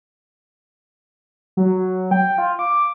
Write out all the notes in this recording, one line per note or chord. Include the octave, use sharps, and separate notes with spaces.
F#3
G5
F4
D6